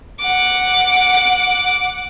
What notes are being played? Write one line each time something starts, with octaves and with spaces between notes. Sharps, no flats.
F#5 D6